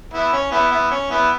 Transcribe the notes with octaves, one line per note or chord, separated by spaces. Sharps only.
B3 E4
C#4
B3 E4
B3 E4
C#4
B3 E4